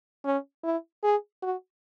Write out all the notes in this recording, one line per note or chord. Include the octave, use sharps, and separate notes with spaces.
C#4
E4
G#4
F#4